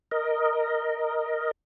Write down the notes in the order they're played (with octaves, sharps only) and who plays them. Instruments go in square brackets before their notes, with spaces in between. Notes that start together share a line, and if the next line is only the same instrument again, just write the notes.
[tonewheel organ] A#4 D#5